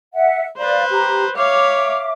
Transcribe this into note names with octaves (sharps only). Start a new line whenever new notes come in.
E5 F#5
B4 C5 D5 F5
G4 A#5
C#5 E5 F5 D6